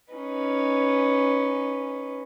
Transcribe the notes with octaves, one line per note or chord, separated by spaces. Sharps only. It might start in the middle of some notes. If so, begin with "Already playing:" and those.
C#4 D#4 B4